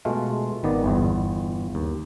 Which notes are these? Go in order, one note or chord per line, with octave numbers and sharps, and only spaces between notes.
B2 G#3 A3 F4
G#1 D#3 B3 D5
G1 E2
D#2